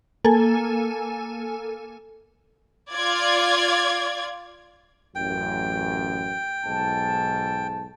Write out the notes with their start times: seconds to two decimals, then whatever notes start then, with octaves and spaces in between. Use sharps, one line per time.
0.24 A#3 A4 G#5
2.93 F4 D5 G#6
5.15 A1 F#2 G5
6.65 B1 G#2 A5